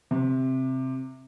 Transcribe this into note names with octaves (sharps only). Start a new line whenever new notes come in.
C3